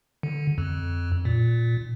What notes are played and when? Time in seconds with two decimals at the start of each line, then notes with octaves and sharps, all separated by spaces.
0.23 D3
0.58 F2
1.25 A#2